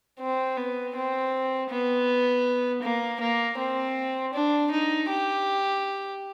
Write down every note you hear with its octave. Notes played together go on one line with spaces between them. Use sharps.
C4
B3
C4
B3
A#3
A#3
C4
D4
D#4
G4